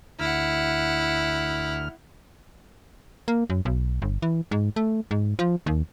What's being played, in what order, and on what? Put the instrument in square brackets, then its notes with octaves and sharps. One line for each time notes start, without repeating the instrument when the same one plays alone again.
[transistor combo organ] D2 F6 [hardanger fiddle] E4 F#5
[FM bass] A#3
F#2
B1
G1
E3
G#2
A3
G#2
F3
D#2